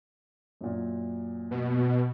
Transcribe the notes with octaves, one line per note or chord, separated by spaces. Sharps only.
F#2 A#2
B2